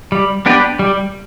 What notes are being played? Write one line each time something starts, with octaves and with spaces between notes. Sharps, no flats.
G3
B3 D4 G4 B4
G3